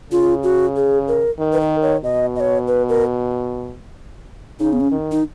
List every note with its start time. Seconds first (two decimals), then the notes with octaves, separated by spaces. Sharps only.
0.12 C#3 F4
0.43 F#4
0.76 G#4
1.08 A#4
1.39 D#3
1.53 B4
1.61 A#4
1.82 C#5
2.04 B2 D#5
2.36 D#5
2.40 C#5
2.68 B4
2.89 A#4
4.60 C#3 D#4
4.73 B3
4.81 C#4
4.92 D#3
5.11 D#4